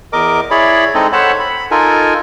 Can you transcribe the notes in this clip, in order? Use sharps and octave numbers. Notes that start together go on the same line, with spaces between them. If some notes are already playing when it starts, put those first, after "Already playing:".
E2 A#4 D#5 D6
E4 G#4 C#5 D5 B5
G#3 C4 D#4 A4 D#5
A4 C5 C#5 F#5 A5 B5
B5
D#4 F4 A4 A#4 G#5